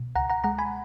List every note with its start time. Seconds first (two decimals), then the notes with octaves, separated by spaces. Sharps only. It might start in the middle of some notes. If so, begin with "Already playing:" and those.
Already playing: B2
0.15 C#2 F#5 A#5
0.30 F#5 A#5
0.44 G#3 F#5 A#5
0.59 G#5 B5